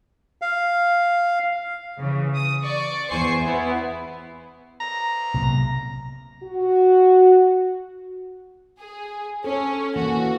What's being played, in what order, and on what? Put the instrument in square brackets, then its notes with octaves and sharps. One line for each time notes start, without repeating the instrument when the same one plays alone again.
[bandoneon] F5
[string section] C#3 E3
D#6
D5 C#6
E2 C5 G#5 C#6 C7
B3 E4
[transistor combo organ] A#5
[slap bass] B1 C3 A#3
[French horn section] F#4
[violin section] G#4
[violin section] C#4 [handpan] A4
[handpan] E3 A#3 C#4 [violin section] F#4